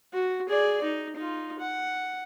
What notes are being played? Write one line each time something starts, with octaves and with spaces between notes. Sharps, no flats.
F#4
G#4 D5
D#4
D#4 F4
F#5